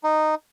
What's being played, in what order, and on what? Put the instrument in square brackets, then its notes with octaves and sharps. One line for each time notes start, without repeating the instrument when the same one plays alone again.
[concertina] D#4